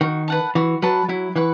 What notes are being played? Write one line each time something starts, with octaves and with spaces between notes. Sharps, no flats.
D#3 F#4
B4 F#5 A5
E3 F#4
F#3 B4 F#5 A5
F#3 E4
E3 B4 F#5 C#6